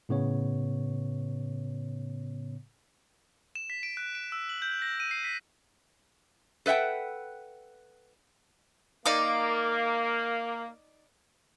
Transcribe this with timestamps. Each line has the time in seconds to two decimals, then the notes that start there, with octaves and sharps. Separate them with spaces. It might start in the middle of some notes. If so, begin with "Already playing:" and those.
0.09 A2 C#3 B3 C#5
3.55 E7
3.70 B6
3.83 D7
3.97 F#6
4.15 D7
4.32 E6
4.49 F#7
4.62 G6
4.82 A#6
5.00 D#7
5.11 C7
5.24 B6
6.66 A4 B4 E5 F#5 G5
9.05 A#3 D#4 D5 D6